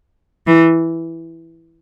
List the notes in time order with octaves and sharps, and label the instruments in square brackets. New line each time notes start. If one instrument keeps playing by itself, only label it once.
[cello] E3